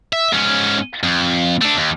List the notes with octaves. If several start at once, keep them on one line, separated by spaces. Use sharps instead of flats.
E5
G#2 C#4
F2
A3 D4
D#2